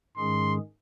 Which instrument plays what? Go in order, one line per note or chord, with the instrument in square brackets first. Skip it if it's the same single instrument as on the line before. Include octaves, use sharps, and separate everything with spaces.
[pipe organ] G#2 D#3 G#3 C#4 G#4 [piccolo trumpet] C6